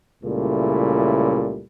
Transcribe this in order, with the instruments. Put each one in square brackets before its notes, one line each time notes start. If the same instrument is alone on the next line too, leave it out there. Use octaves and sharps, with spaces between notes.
[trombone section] C#2 A#2 C#3 G3 A3 E4